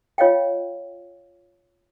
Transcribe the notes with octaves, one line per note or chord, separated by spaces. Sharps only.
F4 C#5 D#5 F5 G5